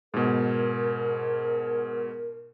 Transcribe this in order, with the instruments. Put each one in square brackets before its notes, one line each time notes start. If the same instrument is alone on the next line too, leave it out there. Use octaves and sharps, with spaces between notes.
[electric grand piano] G#2 B2 [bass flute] A#4